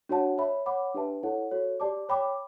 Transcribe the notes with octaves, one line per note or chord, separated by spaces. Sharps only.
D4 F#4 C#5 F#5 A5
C#5 E5 B5
C#5 F#5 B5 D6
D4 G4 B4 E5 A5
E4 A4 C#5 F#5
F#4 A4 C#5
G4 D5 A5 D6
C#5 G5 B5 D6